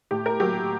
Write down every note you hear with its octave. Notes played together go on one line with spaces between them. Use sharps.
A2 G4
A#4
F#3 A#3 G4